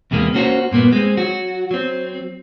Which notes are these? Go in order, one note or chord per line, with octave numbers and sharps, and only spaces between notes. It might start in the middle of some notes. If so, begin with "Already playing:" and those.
E2 C3 G#3 A#3
A#3 C#4 F#4 C5
G2 A#2 A#3 B3
G#3 C4
F#3 F#4
F#3 C4